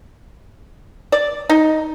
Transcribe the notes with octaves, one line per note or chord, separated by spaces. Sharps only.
D5
D#4